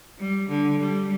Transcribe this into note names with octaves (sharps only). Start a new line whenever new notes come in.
G3
D3
G3